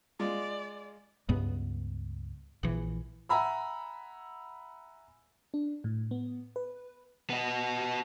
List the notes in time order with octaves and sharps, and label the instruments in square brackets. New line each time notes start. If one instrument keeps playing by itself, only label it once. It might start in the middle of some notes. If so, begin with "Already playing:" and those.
[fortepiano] G#3 F4 [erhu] D5
[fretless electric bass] C#2 G2 B3
A#1 E3
[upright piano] E5 F#5 G#5 A#5 B5 E6
[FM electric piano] D4
A2
B3
B4
[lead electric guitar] B3 D#5